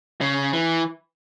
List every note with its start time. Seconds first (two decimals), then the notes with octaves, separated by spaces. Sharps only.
0.21 C#3
0.53 E3